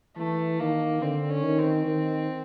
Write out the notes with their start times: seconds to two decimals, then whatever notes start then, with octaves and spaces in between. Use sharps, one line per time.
0.17 E3 A3
0.60 D#3 A#3
1.02 D3 C4
1.30 C#4
1.44 D#3
1.59 C4
1.86 D#3